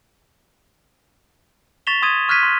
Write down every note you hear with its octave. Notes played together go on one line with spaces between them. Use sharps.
C#6 A6 B6 E7 F7 G7
C6 D#6 G#6 D#7
C#6 F6 F#6 G#6 B6 D#7
C6